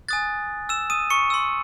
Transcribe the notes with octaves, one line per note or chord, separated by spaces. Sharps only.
G#5 D#6 F#6 A6
E6 E7
D#6 D#7
C#6 C#7
C6 E6